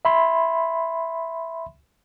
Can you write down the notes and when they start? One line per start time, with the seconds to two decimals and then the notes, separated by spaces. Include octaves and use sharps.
0.05 E5 B5 C6